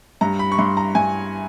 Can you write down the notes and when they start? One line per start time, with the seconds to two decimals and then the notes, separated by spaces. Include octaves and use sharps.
0.21 G2 A#5
0.39 B5
0.52 C#6
0.58 G2 C6
0.77 A#5
0.95 G2 G#5